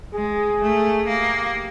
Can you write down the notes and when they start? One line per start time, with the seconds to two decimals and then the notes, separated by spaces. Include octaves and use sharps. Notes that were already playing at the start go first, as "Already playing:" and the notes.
0.14 G#3 G#4
0.61 A3
1.07 A#3 G4